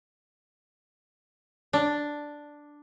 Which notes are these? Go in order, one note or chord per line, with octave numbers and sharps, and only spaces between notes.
D4